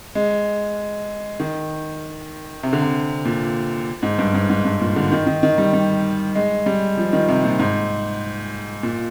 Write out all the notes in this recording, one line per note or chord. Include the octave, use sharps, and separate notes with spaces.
G#3
D#3
C3
D3
C3
A#2
G#2
G2
G#2
G#2
G2
A#2
D3
D#3
D#3
D#3
G3
G3
G#3
G3
F3
D#3
C3
A#2
G#2
A#2